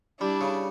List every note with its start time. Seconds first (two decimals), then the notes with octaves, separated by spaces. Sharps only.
0.21 G3 D4 E4
0.41 C#3